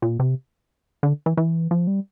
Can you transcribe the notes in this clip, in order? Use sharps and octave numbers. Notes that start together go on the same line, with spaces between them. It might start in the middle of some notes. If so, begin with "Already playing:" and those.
A#2
C3
D3
E3
E3
F3
G3